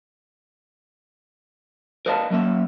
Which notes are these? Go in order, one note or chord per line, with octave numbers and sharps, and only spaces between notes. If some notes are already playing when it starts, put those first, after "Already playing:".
A#4 B4 D5 D#5 F5 A5
F#3 A#3 C#4 E5